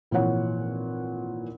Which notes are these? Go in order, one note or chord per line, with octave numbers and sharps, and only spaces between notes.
G#1 A#2 E3 F3 C#5 F#5